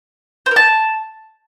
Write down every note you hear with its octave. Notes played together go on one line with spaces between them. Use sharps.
C5
A#4
A5